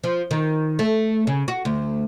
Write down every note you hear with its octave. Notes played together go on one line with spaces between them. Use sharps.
F3
D#3
A3
C#3
F#4
D2